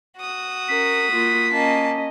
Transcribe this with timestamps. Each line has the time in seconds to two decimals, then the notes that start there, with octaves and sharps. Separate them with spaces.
0.17 F#4 D#6
0.69 C#4 A#4 B6
1.12 A#3 F4
1.52 A#3 C#4 D#5 A5